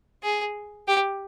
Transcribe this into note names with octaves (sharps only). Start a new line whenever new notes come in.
G#4
G4